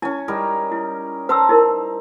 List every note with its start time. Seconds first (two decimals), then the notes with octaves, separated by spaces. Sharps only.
0.02 C#4 E4 G#5
0.28 G3 D#4 A#4
0.72 E4
1.29 B4 C5 A5 A#5 E6
1.49 D#4 E4 A#4